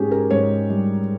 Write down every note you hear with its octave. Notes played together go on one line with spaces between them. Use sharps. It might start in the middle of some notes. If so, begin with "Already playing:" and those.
Already playing: G#2 C#4 G4 G#4
A#4
G#2 C#5
G3